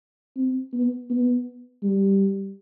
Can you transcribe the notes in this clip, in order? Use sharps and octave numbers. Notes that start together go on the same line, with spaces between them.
C4
B3
B3
G3